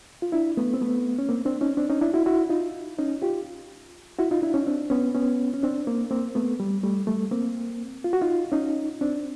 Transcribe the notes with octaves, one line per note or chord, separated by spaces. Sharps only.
F4
D4 E4
A3 B3
C4
A3 B3
C#4
A#3 C4
C4 D4
C#4 D#4
C4 D4
C#4 D#4
D4 E4
E4 F#4
E4 F#4
D#4 F4
C#4 D#4
F4 G4
E4 F#4
D#4 F4
D4 E4
C#4 D#4
C4 D4
B3 C#4
B3 C#4
C#4
C4 D4
A#3 C4
A#3 C4
A3 B3
G3
G3 A3
G3 A3
A#3 C4
F4
F#4
D#4 F4
C#4 D#4
C4 D4